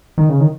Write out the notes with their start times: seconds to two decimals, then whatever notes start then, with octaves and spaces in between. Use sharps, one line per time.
0.18 D#3
0.29 C#3
0.40 D#3